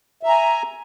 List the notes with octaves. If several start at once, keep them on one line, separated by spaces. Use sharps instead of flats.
E5 G#5 A#5